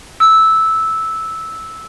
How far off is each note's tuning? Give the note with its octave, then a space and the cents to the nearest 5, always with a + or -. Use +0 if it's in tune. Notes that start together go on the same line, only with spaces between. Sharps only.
E6 -10